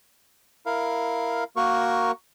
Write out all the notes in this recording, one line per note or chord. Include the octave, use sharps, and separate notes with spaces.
E4 A#4 F5
A#3 F#4 A#4 C#6